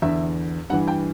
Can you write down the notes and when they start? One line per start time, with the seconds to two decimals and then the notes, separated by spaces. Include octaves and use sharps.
0.02 E2 D3 E5
0.70 G2 F#5
0.73 E3
0.88 G5